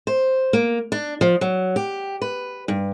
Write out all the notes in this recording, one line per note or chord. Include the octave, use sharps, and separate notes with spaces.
C5
A#3
D4
F3
F#3
G4
B4
G2